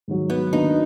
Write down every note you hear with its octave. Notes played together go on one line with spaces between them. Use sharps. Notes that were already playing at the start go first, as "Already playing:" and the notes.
G#2 D#3 F#3
B3
D#3 A#3 D4 D#4 F#4 B4